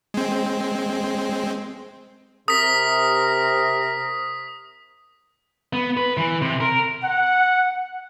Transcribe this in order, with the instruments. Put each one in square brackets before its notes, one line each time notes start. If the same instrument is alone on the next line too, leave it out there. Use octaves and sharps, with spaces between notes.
[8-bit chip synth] G#3 C4
[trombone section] C3 [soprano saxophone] A#4 [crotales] D#6 B6
[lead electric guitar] B3
B4
E3
C3
A#4
[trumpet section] F#5